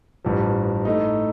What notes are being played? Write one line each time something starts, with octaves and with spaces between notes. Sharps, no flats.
A1 G2 F3
A2 A3 D#4